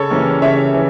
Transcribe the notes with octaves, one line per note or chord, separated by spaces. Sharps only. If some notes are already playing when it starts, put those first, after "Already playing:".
Already playing: C#3 A4 C#5
E3 G3 A#3 C#4
C#3 C#5 E5
E3